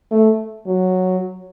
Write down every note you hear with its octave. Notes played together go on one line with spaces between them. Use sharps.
A3
F#3